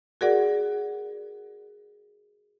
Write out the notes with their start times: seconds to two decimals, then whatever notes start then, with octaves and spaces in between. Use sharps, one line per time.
0.21 F#4 G#4 A#4 D5 F#5